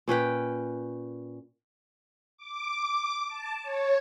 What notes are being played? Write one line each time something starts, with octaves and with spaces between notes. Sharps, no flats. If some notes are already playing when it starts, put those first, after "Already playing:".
A#2 C#4 B4 G5
D6
A5
C#5